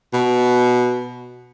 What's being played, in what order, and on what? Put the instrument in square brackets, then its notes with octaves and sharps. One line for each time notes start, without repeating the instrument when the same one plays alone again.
[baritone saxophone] B2